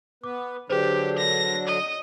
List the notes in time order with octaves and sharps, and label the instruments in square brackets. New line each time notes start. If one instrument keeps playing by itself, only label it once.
[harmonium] B3 B4 [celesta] D6
[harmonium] D3 F#3 D4 [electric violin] G4 [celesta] G#4 B4 C5
[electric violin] A#6
D#5